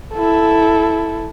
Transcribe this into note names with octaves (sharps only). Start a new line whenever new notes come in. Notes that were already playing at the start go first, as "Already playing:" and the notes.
E4 A4